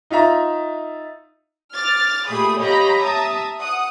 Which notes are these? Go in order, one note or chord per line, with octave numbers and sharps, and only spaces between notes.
D#4 F4 E5 A#5
D6 F6 A6
A#2 A3 G4 G#4 B5 D#6
G4 C#5 D#5 F5 A#5 B5
E5 A5 A#5 D#6
F#5 D#6